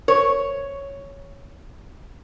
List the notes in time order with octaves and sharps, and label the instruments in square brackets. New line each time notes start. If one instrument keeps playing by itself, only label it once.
[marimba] A#4 C5 C#6 [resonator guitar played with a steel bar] C#5